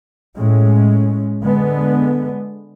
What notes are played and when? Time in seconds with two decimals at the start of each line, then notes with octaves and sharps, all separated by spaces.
0.37 A2 G#3 C#4
1.43 D3 G#3 B3